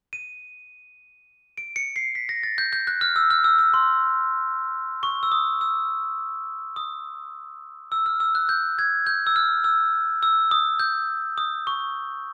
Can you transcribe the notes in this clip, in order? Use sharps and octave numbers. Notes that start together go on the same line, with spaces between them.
D#7
D7
C#7
C7
B6
A#6
A6
G6
G6
F#6
F6
E6
F6
E6
E6
C6
C#6
E6
D#6
E6
D#6
E6
F6
E6
F#6
G6
G#6
G6
E6
F6
E6
E6
D#6
G6
D#6
C#6